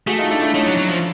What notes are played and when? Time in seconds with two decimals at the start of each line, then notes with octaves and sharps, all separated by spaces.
0.07 A3 F#4 G#4
0.19 D#4 F4
0.31 D4 E4
0.42 D4 E4
0.54 A3 C#4 D#4
0.66 F#3
0.77 F#3
0.89 F3